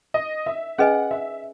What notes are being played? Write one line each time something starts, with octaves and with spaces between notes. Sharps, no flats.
D#5
E5
C#4 G#4 B4 D#5 F#5 G#5
E5